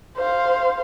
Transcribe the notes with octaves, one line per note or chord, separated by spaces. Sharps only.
C5 F5